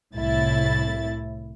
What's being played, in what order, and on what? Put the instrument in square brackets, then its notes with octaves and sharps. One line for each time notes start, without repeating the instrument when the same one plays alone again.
[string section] C2 A2 E4 A6